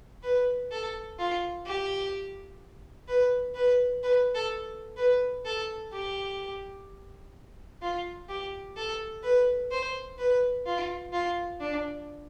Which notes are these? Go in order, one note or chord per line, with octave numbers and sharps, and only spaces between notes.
B4
A4
F4
G4
B4
B4
B4
A4
B4
A4
G4
F4
G4
A4
B4
C5
B4
F4
F4
D4